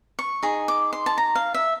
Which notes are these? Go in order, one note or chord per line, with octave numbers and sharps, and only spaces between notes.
C#6
D#4 G#4
D6
C6
A5
A#5
F5
E5